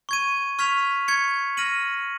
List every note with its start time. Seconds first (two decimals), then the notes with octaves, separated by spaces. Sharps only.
0.09 C#6 G#6 D#7
0.59 C#6 F6 G#6 B6 F7
1.08 C#6 G#6 C#7
1.57 F6 A#6 D#7 F#7